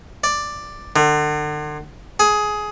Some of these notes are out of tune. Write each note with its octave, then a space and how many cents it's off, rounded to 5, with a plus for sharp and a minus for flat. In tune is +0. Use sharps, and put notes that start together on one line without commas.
D5 +5
D3 +40
G#4 +15